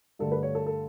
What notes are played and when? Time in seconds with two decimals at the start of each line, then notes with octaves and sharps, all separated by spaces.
0.19 G2 D3 A3 A4
0.32 B4
0.43 C#5
0.55 A4
0.66 A4